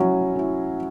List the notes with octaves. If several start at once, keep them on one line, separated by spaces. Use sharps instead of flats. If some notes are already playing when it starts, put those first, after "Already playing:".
Already playing: F#3 C#4 E4
C#4 E4